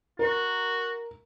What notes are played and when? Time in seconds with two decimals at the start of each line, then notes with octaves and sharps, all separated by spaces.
0.19 F#4 A#4